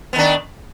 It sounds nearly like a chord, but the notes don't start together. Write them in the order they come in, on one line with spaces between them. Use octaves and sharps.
B3 D#3 D4